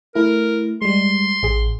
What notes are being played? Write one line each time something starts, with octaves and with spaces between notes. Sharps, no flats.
A3 E4 A#4
G3 G#3 C6
A1 G#4 C7